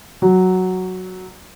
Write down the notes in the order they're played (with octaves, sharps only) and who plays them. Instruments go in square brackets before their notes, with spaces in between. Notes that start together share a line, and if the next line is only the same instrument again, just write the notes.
[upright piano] F#3